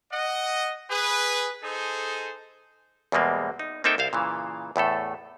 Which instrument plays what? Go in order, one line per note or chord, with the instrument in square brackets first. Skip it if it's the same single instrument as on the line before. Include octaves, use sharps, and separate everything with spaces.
[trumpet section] D#5 F#5
G#4 B4
D#4 G#4 A4 C5
[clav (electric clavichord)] E2 B2 G3 G#3 A#3 C4
D#4
A#3 C4 D#4 A4 E5 G5
C2 C5 F5
A#2 C#3 E3
E2 A2 A3 A4